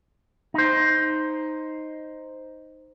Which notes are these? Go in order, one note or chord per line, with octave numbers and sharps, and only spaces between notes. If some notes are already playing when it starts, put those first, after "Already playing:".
D#4 C5